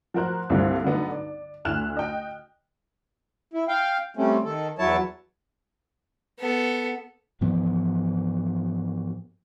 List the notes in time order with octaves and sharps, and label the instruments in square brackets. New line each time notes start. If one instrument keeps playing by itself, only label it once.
[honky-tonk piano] F3 F#4 A#4 C5 F#6
C2 G2 A#2 D3 C4
D3 F#3 B3 D#4
D5
D2 D3 E4 F6 F#6 E7
D#5 G5
[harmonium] E4
F5 G5
G3 A3 C4 C#4
D#3 A4
E2 F#3 E4 C#5 A5
[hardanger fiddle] B3 A4
[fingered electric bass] G#2 E3 F3 B3